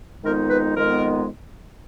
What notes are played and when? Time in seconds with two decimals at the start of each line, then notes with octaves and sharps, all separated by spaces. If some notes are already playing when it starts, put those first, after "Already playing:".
0.24 F2 D#3 G#3 B3 D#4 A#4
0.50 B4
0.76 F2 D#3 G#3 B3 D#4 A#4